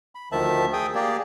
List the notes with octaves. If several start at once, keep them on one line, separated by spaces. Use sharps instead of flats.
B5
D2 D#3 F3 E5 A5
G#4 G5 D#6
A#3 G4 G#4 D5